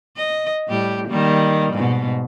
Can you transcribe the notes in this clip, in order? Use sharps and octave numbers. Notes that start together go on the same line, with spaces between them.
D#5
A2 G3 G4
D#3 G3 A#3
G#2 B2